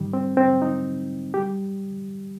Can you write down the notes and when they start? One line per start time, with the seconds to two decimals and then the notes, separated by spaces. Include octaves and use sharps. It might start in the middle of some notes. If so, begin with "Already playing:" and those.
Already playing: G#2 D#3 G3
0.13 C4
0.37 C4
0.62 D#4
1.34 G4
1.38 G3